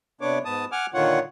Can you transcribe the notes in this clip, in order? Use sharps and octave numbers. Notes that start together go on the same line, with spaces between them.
C3 B3 D4 C#5 D6
G#2 B3 A5 D#6
F#5 G#5 D6 F6
A#2 D3 D#3 F4 C#5 F#5